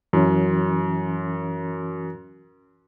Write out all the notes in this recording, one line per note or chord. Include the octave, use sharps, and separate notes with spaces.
F#2 E3 C#4